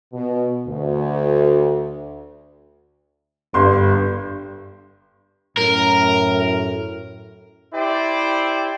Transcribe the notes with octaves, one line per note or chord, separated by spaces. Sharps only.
B2
D2
G1 G2 C6
F#2 A2 A#4
E4 G4 C5 D5